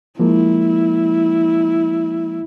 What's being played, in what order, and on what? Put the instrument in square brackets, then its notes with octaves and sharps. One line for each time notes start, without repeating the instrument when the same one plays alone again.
[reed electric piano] F3 G#3 A#3 [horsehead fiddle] E4